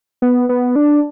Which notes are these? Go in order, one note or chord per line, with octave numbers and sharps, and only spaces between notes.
B3
B3
D4